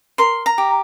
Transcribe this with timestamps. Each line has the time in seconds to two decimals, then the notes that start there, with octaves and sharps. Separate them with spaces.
0.18 A#4 C6
0.46 A#5
0.58 G4